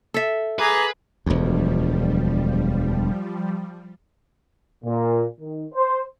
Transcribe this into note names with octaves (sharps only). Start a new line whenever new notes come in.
A4 E5
G#4 B4 A#5 D6
E1 D2 F3 G3
A#2
D#3
C5